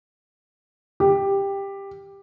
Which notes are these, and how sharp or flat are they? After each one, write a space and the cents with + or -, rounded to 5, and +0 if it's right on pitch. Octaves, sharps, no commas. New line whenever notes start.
G4 +10